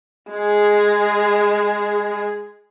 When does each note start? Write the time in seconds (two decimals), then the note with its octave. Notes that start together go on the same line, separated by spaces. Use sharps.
0.30 G#3 G#4